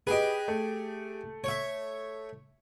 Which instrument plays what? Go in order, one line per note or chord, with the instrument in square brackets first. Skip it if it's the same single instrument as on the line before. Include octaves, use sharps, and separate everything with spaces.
[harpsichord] G4 G#4 [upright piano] B4 D#5
[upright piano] A3
[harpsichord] C#5 E5